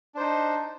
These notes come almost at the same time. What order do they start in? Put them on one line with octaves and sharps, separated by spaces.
D4 C5 D#4